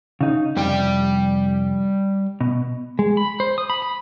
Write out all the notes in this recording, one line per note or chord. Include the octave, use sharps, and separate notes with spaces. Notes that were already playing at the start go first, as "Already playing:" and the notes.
C#3 D#4
C2 F2 G3 D5 G5
B2
G#3
B5
C5
D#6
B5
B5